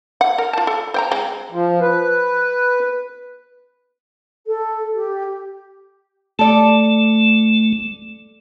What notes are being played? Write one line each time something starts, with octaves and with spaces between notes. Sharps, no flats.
F#5
A#4
F4 A5
A4
C5 G5 A#5
G#3 C4
F3
B4
A4
G4
A3 A4 D5